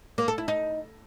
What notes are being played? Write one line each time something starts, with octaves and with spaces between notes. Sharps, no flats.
A#3
A4
E4
D#4